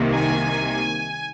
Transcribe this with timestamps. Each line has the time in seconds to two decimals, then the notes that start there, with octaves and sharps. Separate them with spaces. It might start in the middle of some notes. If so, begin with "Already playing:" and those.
Already playing: C2 C3 D#3 A#3
0.14 G#5